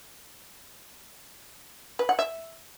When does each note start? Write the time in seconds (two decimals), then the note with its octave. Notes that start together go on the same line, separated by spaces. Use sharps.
1.99 B4
2.09 F#5
2.19 E5